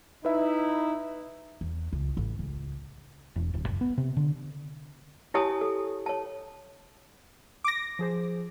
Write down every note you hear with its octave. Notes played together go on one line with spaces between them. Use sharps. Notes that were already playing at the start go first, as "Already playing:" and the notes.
D#4 E4 B4 E5
E2
C#2
A1
C#2
E1
D1
F#1
B3
C3
D3
E4 G4 C#5 G#5 A5 D#6
A4
C#5 A5
D6 A#6
F3 G#4 C5